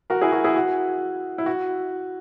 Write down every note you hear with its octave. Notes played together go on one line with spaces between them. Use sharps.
F#4 A#4
E4 G#4
F#4 A#4
E4 G#4
F#4
E4
F#4